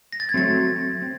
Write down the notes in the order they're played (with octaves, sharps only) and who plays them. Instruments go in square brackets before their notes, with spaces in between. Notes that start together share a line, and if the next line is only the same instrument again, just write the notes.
[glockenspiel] A#6
A6
G#6
[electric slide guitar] F#3 A3 C4 [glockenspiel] A6
[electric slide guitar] C4